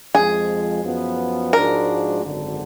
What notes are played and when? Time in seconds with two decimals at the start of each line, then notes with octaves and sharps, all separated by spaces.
0.15 F2 F3 G#3 G#4
0.84 F#2 F3 B3
1.52 G#2 F3 G#3 D4 F#4 A#4
2.22 G#1 F#2 D3